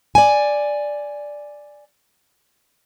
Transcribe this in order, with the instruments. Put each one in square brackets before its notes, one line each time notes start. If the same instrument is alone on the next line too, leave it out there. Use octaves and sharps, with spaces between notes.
[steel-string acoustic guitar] D5 G#5